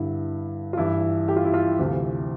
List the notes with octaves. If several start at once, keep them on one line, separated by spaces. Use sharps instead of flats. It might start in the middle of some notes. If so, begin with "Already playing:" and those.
Already playing: G2 D3 E4
F4
G2 E3 E4
G4
F4
E4
F4
D2 C3 E3